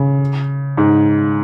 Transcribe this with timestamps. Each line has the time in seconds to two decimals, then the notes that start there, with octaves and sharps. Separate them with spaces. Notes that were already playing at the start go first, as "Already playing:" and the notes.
Already playing: C#3
0.77 G#2